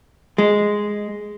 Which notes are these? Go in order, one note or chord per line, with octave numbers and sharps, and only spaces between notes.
G#3